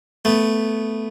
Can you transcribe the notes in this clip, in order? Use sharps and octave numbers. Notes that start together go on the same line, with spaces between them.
A3 B3